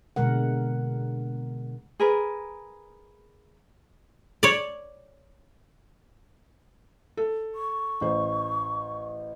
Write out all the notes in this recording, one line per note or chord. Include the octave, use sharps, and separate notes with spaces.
B2 D3 G#3 A#4 F#5
G#4 A#4 B4
C#5 D5
A4
C#6
A1 C5